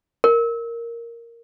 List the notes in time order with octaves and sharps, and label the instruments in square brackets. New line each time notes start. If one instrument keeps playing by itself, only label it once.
[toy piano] A#4